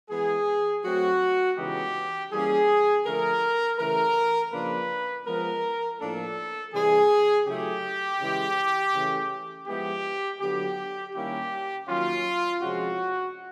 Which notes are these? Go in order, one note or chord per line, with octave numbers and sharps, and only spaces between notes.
E3 G#3 B3 G#4
F#3 A3 C4 F#4
C#3 E3 G#3 B3 D#4 G4
E3 G3 A#3 C#4 G#4
D3 F3 A3 A#4
C#3 E3 A3 A#4
C#3 F3 A#3 D4 F4 B4
F3 G#3 B3 A#4
A2 F3 A#3 D4 A4
C3 E3 G3 G#4
C#3 F#3 A3 C#4 E4 G4
C#3 E3 G#3
C#3 E3 A3 C#4
F3 G#3 B3 E4 G4
D3 F#3 B3 G4
D#3 G3 A#3 C#4 E4 G4
D#3 F#3 A#3 C#4 F4
C3 F3 G#3 C#4 F#4